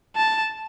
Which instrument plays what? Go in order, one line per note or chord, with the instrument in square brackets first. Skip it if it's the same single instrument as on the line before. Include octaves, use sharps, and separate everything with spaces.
[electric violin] A5